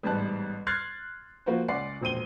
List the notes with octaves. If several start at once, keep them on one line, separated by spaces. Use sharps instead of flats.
A1 G#2 G3 B3 A5 F#6
C6 F6 F#6 G#6 A6 C7
F3 A#3 F4 F#4 B4 C5
C#2 C#4 D5 F#5 C6 C7
E1 A#1 C5 D#7 G7